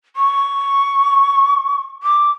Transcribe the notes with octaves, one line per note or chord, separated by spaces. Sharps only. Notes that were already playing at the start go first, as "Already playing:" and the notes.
C#6
D6